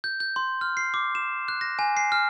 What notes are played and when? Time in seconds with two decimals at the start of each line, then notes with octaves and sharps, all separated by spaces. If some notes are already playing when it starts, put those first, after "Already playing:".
0.04 G6
0.20 G6
0.36 C6
0.61 F6
0.77 C7
0.94 D6
1.15 E7
1.48 F#6
1.61 A#6
1.79 G#5
1.97 C7
2.12 F6